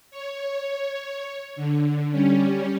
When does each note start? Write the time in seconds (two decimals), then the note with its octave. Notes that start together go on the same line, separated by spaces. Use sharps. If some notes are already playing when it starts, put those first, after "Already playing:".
0.11 C#5
1.56 D3
2.10 G3 C#4